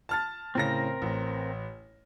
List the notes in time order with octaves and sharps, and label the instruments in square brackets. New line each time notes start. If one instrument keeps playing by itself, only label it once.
[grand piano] A5 F6 A6
[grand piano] A2 C#3 A#6 [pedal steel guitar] C4 A#4
[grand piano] A1